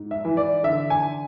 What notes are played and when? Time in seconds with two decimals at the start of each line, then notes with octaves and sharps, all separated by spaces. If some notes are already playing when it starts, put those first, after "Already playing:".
Already playing: G#2
0.11 E5
0.25 E3
0.37 D5
0.63 D3 E5
0.90 G#5